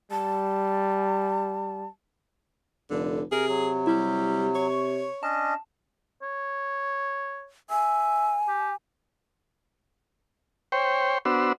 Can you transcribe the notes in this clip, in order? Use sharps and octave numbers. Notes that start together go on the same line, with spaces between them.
G3 A5
F1 D3
C3 G#4 A#4 G#5
F#3
G3 E4
C#5 C#6
C#4 D4 D#5 A5
C#5
E5 G#5
G4
C5 C#5 G5
B3 D4 F#4 C5 E6